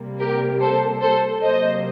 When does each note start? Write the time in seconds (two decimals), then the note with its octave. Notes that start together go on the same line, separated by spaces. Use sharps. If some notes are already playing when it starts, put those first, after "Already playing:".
Already playing: C3 G3 A#3
0.20 G4 A#4
0.61 A4 C5
1.01 A4 C5
1.42 C3 F#3 A#3 C5 D#5